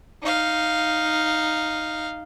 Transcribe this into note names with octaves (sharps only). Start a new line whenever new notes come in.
D#4 F5